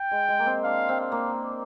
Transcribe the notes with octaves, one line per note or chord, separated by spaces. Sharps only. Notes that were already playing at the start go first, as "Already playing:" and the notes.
Already playing: G5
G#3
G#3
A#3
C4
D4 F5
C4
F5
A#3